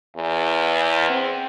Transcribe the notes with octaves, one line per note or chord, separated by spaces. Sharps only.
E2
C4